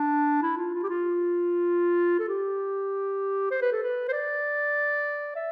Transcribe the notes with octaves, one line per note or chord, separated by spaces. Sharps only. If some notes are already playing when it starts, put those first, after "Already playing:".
Already playing: D4
E4
F4
F4
G4
F4
A4
G4
C5
B4
A4
B4
C5
D5
E5